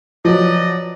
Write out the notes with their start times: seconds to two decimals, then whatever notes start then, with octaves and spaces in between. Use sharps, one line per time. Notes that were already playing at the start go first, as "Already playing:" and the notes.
0.25 F3 F#3 B4 D5 D#5